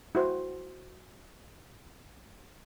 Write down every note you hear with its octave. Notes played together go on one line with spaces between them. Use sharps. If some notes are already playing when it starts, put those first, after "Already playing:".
E4 F#4 C5